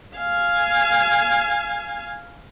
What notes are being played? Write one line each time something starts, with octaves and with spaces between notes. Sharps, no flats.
F5 G#5